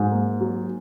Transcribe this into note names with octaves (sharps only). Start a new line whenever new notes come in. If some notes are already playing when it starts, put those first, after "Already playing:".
Already playing: G#2 F#3
A#3
F#3